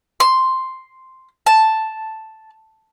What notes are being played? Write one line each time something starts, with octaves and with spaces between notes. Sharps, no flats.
C6
A5